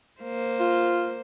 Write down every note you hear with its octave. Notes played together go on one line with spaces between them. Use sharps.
A#3 C5
F4